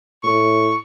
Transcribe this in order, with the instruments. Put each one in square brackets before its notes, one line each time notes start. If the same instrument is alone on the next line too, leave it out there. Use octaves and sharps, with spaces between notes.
[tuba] A2 [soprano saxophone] C#6